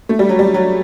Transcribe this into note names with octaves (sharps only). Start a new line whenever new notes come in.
A3
G3
F#3
G3
F#3